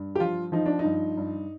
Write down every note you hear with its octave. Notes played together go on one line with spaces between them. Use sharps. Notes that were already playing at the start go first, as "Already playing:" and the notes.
Already playing: G2
G4
F3 F4
F3 D#4
D4
D#4
G2
G2